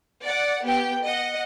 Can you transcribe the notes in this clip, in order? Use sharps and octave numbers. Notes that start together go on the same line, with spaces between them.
D5 F#5
B3 G4 G5
D#5 F#5